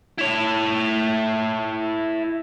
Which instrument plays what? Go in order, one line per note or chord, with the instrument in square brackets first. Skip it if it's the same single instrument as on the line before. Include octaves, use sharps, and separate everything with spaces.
[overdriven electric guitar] E4 C#5